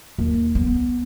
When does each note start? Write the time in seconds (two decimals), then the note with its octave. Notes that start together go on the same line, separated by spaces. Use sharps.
0.18 D#2
0.55 B3